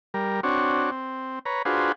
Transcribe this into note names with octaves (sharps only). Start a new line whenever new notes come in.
G3 A#4
C4 D4 F#4 C#5
C4
B4 C#5 A#5
D4 F4 F#4 G#4 B4 C5